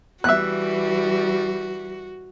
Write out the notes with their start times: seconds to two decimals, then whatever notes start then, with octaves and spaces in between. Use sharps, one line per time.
0.24 E3 G3 F#4 E5 F#6